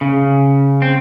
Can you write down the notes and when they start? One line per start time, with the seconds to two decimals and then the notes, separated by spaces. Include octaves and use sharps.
0.01 C#3
0.82 C4